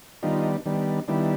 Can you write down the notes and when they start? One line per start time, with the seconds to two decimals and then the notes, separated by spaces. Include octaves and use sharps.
0.23 D#3 G3 B3 D4 D#4 F4
0.65 D#3 G3 B3 D4
1.08 D#3 G3 B3 D4 E4